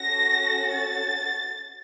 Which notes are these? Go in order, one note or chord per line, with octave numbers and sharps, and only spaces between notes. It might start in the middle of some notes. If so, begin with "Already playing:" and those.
Already playing: C#4 F#4 A4 A#6
A6